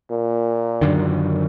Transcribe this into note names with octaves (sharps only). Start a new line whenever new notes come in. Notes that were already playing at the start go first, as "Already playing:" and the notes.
A#2
F#2 D3 D#3